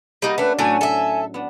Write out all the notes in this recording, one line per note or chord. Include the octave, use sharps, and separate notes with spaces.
G3 A#3 D#4 F#4 G#4
A3 C#4 D4 G4 B4
A2 F#3 A3 D4 F#4 G#5
A4 E5
B3 D4